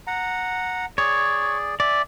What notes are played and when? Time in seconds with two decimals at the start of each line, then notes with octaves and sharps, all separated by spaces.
0.07 F#5 A#5
0.98 G#4 C#5 D5
1.80 D5 E5 G#5